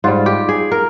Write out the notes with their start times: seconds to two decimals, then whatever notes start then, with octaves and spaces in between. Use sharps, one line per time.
0.04 G#2 G3 F4
0.26 G4
0.49 G#4
0.72 A#4